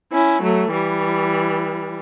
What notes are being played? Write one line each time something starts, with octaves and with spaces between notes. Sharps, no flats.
C#4 E4
F#3 A3
E3 G3